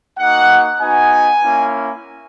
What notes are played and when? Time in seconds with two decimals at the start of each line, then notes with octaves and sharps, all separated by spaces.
0.18 A#3 D#4 F#4 F#5
0.81 B3 D#4 F#4 G#5
1.43 A#3 C#4 E4